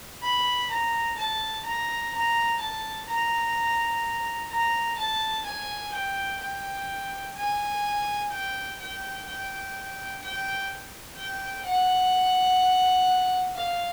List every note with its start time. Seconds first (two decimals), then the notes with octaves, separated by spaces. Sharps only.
0.22 B5
0.70 A#5
1.17 A5
1.65 A#5
2.14 A#5
2.60 A5
3.09 A#5
4.51 A#5
4.98 A5
5.45 G#5
5.94 G5
6.41 G5
7.36 G#5
8.31 G5
8.79 G5
9.27 G5
10.22 G5
11.16 G5
11.64 F#5
13.54 F5